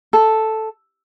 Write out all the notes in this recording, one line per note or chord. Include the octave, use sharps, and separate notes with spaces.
A4